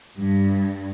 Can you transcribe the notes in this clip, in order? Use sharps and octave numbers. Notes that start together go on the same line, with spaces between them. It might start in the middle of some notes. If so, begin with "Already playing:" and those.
G2